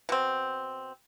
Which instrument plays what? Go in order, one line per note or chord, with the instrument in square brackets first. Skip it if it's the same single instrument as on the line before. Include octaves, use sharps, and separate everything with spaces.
[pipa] B2 C4